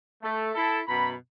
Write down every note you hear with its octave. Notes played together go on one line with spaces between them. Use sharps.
A3
E4 A4
F#2 B2 A#5 B5